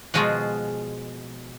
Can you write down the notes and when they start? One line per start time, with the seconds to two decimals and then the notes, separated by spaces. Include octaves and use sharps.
0.14 B2 F3 G#3 F4 F#4 G#4